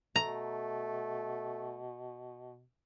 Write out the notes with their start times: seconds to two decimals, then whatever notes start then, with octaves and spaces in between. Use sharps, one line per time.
0.16 B2 A3 A#5